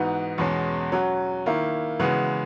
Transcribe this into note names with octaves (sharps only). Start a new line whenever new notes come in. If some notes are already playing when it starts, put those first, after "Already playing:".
Already playing: G#2 E3 B3 D#4 F#4
E2 B2 G#3 C#4
F#3 C#4 F#4
D#3 A#3 E4
C#3 E3 G#3 B3 F#4